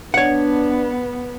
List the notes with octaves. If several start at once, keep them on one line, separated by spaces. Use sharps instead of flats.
B3 D4 C#5 F#5